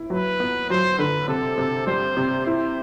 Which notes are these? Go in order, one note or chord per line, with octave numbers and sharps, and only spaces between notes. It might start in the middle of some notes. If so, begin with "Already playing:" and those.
Already playing: E4
F#3 B4
B3
F#3 C5
D3 B4
C3 A4
C3
G3 C5
C3
E4 C5